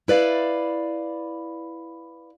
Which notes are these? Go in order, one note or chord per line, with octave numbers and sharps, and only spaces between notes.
E4 B4 D5 F5